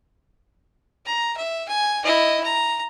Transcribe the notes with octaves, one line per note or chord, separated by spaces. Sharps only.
A#5
E5
G#5
E4 D#5
A#5